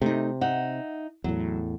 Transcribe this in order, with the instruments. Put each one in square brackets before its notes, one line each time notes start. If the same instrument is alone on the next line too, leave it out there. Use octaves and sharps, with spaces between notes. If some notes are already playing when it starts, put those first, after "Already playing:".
[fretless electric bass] C3 [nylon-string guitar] A3 D#4
[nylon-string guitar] D#4 E5 F#5
[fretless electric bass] E2 A2 [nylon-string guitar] F#3